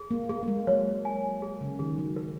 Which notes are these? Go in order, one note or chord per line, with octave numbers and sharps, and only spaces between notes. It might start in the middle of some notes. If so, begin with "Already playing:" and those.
Already playing: G#4
A#3
A#3 G#4
A#3
G#3
F#3 C#5
G#5
G#4
C#3
D#3 G#4
F#3
A#4